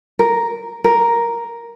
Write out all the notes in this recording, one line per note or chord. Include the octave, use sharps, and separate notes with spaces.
A#4
A#4